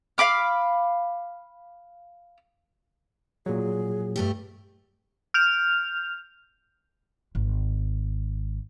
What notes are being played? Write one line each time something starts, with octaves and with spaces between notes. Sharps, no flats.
F5 B5 D6 F6
A#2 F#3 G#4
G2 A3 G4
F6 G6 F7
G#1